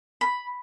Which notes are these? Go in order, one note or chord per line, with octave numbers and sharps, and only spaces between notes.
B5